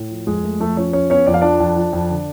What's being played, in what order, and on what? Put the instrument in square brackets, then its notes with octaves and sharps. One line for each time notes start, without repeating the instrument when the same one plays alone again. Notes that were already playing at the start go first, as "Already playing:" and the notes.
Already playing: [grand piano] A2
F3
F2 G#3 G#4
A3
F2 A3 A4
F3 C#4 C#5
F2 C#4 C#5
B3 C#4 C#5
F2 D5
F5
F3 D4 D5
F2
F3
F2
D3